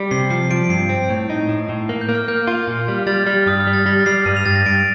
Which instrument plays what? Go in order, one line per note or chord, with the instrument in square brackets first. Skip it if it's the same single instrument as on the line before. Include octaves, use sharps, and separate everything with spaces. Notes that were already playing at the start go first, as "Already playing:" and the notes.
Already playing: [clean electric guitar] G3
[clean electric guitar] C3 [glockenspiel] C7
[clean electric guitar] F3 [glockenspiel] C7
[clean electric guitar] F3 [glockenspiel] D7
[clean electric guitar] G2 [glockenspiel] C7
[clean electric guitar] C4
A2
D#4
A2
A2
A#3
[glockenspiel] G6
[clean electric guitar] A#3
[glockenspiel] F6
[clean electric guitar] A#3 [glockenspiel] G6
[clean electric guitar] F4
A#2
G3
[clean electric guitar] G3 [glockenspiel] A6
[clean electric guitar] G3 [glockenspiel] F6
[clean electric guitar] G2 [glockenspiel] D#6
[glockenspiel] F6
[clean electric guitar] G3
[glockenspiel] A6
[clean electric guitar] G3 [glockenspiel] A#6
[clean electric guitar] G3 [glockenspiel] C7
[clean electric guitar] G2 [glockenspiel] D#7
[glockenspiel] F7
[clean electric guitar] G2 [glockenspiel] A6
[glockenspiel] A#6
[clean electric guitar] G2 [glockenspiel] D7